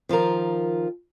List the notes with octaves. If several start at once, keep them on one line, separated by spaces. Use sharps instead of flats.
D#3 F3 F4 A#4